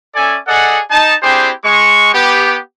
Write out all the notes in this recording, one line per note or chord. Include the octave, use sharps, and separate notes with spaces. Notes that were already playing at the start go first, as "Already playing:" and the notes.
C#4 A4 D5 E5 G#5
G#4 A4 D5 D#5 F#5
D#4 A5
C4 D4 E4 G4 G#4 C5
G#3 C#6
B3 G4